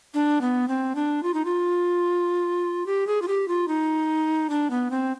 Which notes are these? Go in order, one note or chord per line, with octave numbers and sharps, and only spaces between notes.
D4
B3
C4
D4
F4
D#4
F4
G4
G#4
F4
G4
F4
D#4
D4
B3
C4